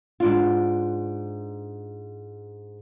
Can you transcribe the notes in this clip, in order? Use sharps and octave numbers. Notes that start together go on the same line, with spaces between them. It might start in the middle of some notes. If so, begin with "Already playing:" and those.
G#2 D4 F4